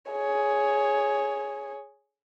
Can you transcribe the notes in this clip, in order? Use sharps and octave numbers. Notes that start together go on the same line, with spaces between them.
G#4 C#5